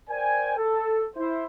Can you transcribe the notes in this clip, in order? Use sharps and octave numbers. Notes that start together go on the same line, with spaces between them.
A#4 C5 D5 G5 G#5
A4
E4 C5